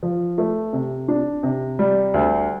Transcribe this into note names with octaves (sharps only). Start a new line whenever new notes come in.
F3
A3
C3
D4
C3
G3
D2